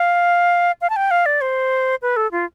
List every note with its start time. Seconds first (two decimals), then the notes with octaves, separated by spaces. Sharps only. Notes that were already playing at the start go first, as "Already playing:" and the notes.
Already playing: F5
0.81 F5
0.90 A5
0.96 G5
1.11 F5
1.26 D5
1.41 C5
2.02 B4
2.17 A4
2.32 F4